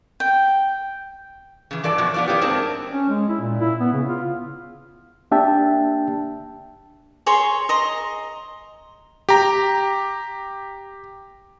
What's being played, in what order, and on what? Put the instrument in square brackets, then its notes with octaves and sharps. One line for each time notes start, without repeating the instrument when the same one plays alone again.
[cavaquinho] G5
[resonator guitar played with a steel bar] C#3 E3
G2 E3 A4 D5
F#2 B2 F3 F#3
B3 F4 D5
A#3 B3 C#4 E4 G4
G#2 C4 D4 G#4 A#4 A5
[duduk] C#4
G#3
E4
A#2
E4
B3
C#3
F4
[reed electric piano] A#3 D4 G4 E5 G5 A5
[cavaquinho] G#4 C#5 A#5 C6
D#5 A#5 C6
[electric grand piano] G4 A#5